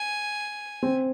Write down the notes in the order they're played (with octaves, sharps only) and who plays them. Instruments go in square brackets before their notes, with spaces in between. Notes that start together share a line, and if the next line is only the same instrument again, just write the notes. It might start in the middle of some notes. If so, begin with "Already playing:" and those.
Already playing: [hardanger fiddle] G#5
[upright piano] C4